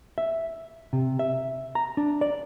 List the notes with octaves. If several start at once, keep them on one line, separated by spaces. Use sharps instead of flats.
E5
C3
E5
A#5
D4
D5